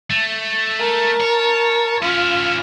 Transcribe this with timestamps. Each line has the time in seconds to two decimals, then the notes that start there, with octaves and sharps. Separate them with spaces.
0.10 A3
0.79 A#4 A5
1.21 C#5
2.02 C#4 E4 F4 F6